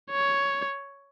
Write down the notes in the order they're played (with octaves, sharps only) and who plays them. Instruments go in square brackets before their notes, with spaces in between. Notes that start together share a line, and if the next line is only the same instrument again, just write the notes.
[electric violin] C#5